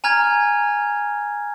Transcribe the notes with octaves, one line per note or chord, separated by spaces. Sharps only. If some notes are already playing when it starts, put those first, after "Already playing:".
G#5 A#5 F6 G#6